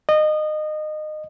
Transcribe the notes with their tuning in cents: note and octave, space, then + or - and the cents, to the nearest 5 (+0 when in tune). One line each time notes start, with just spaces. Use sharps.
D#5 -25